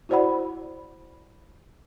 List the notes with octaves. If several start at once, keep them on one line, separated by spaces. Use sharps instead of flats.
E4 F#4 C5 D5 F#5 B5